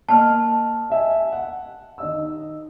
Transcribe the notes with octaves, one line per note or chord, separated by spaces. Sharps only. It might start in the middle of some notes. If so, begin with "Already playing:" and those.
A#3 D#5 A5 F6
D#5 E5 G#5
F#5
D#3 D#5 E6